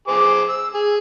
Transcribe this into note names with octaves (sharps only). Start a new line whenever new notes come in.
G#4 C5 D6
E6
G#4